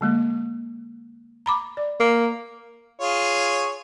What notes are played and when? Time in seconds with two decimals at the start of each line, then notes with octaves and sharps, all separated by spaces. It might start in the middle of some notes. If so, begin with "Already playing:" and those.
0.01 D3 G#3 A#3
1.46 A#5 B5 D6
1.77 D5
2.00 A#3
3.00 F4 G#4 C#5